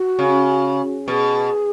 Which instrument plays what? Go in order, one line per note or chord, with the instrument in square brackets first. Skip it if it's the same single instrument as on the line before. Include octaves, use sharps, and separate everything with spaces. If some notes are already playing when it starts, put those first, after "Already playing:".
Already playing: [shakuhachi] F#4
[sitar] C#3
[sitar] B2 [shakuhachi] G#4